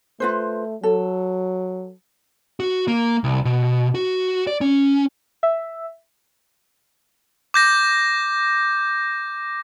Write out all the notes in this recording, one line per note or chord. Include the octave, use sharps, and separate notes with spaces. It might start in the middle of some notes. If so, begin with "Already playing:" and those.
A3 F4 B4 C5
F#3 A4
F#4
A#3
C2
B2
F#4
D5
C#4
E5
D6 G6 A#6